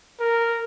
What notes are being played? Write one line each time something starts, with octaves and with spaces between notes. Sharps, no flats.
A#4